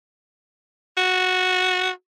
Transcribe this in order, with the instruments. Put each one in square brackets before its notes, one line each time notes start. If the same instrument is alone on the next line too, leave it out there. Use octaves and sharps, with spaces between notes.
[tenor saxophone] F#4